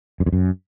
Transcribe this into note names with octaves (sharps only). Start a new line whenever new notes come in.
F#2
F2
F#2